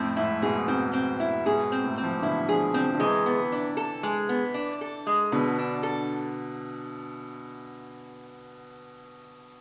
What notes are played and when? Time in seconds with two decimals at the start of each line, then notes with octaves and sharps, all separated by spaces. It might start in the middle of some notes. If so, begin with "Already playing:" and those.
Already playing: F2 A2 C4
0.17 G#2 E4
0.42 G#2 B2 G#4
0.68 G#2 B2 C4
0.93 C4
1.20 E4
1.45 G#2 B2 G#4
1.72 C4
1.84 A2 C3
1.98 C4
2.04 F3
2.13 E3
2.22 B2 D3 E4
2.49 D3 F3 G#4
2.74 D3 F3 C4
2.95 D3
3.00 C3 E3 G#3
3.26 B3
3.52 D4
3.77 A4
4.03 G#3
4.29 B3
4.54 D4
4.81 A4
5.07 G#3
5.32 B2 D3 B3
5.58 D4
5.83 A4